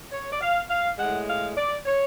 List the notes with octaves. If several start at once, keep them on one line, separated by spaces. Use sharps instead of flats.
C#5
D5
F5
F5
A2 G#3 F#5
F5
D5
C#5